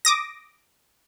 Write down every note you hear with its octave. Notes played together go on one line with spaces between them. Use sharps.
D6 D#6 A#6